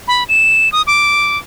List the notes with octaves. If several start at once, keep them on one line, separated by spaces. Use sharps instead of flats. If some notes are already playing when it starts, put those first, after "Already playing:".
B5
E7
D#6
D6